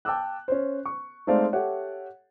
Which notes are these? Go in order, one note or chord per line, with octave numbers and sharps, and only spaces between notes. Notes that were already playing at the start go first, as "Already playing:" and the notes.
G5 A5 D6 E6 F#6
C#4 C5
C#6
G#3 A3 C4 D#4 D5 F5
G4 A4 C#5 E5 F#5